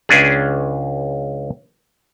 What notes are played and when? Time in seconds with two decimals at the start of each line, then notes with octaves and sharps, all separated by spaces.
0.09 C#2 C#4 D4 G#4